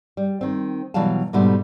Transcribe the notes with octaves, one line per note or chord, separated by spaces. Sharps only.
G3
D#3 C4
B2 E3 F#3 G3 F5 A5
G#2 B2 D3 G3 A3